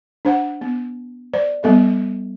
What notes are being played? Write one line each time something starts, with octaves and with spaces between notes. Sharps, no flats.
D4 C5 F#5
B3
C5 D5
G3 B3 A4 E5